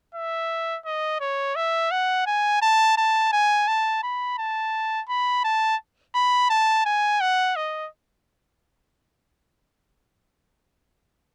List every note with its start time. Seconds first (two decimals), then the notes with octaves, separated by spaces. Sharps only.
0.15 E5
0.85 D#5
1.21 C#5
1.56 E5
1.91 F#5
2.26 G#5
2.62 A5
2.97 A5
3.32 G#5
3.67 A5
4.03 B5
4.38 A5
5.09 B5
5.44 A5
6.15 B5
6.50 A5
6.85 G#5
7.21 F#5
7.56 D#5